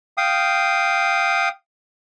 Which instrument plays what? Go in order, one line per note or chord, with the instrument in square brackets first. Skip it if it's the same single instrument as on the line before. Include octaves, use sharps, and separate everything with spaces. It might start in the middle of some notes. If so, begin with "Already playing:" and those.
[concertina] F5 G5 D#6